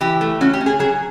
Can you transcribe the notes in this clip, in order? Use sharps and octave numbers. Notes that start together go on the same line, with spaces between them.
E3 G4
A3
C#4 F#4
G4
C#4
G#4
F#3 G#4